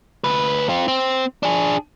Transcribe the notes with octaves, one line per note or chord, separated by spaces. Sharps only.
D2 B4
C4 F4
C4
D4 G#4